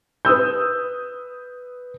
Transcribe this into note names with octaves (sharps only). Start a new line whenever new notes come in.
B4 D#6 E6 G6